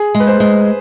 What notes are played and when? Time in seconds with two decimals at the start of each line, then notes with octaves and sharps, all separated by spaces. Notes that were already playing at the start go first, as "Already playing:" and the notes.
Already playing: G#4
0.15 G#3
0.20 B4
0.27 C5
0.40 G#3